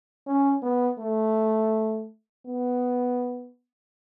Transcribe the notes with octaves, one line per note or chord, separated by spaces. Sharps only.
C#4
B3
A3
B3